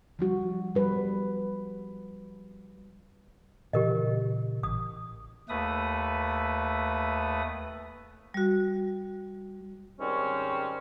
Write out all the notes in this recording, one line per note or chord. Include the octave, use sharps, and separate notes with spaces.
F3 G3 F#4
G3 B4
A#2 C#3 E3 G4 A#4 D#5
A1 D#6
D#2 A3 B4 D#6
G3 F#4
G#2 D#3 G3 C4 C#4